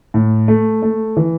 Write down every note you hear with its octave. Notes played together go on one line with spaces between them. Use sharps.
A2
A3
A3
E3